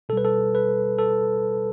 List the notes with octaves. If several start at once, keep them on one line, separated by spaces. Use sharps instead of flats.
B2 G3 A4 B4
A4
B4
A4